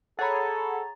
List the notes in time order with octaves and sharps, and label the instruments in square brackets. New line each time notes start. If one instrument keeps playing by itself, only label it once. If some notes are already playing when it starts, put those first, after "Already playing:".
[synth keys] G#4 C#5 [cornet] A4 [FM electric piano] F#5 B5 [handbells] A#5 A6